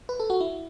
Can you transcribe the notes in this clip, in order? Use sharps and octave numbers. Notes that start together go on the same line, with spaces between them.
B4
A4
F#4
E4